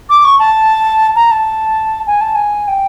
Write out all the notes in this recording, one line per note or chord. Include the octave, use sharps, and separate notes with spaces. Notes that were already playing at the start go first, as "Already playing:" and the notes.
D6
C#6
A5
A#5
A5
G#5
A5
G#5
G5